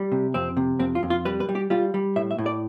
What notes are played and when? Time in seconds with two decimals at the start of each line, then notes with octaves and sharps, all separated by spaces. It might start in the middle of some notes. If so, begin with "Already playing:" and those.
Already playing: G3
0.12 C3
0.34 F2 C4
0.57 C3
0.79 F2 C4
0.95 F4
1.03 F2
1.10 F4
1.25 G3 B4
1.40 B4
1.49 G3
1.55 G4
1.70 G3 F4
1.94 G3
2.16 A2 E5
2.31 E5
2.38 A2
2.46 D5